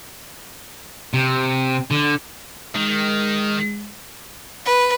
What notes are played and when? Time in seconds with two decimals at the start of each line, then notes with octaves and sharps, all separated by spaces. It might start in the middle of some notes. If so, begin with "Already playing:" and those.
1.14 C3
1.91 D3
2.75 D#3 G#3
4.66 B4